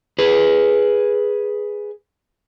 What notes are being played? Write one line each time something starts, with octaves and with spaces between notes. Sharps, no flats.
G#4 B4